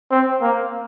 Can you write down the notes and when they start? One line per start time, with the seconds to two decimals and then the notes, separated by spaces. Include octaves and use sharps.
0.11 C4
0.42 A#3